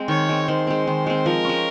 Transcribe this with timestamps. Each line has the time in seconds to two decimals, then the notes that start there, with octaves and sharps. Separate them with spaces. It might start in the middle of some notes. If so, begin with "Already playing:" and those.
Already playing: G#3 C4
0.08 D#3 C#5
0.29 G#3 C4
0.48 D#3 C5
0.67 G#3 C4
0.87 D#3
1.07 G#3 C4
1.26 F3 A#4
1.45 G#3 C#4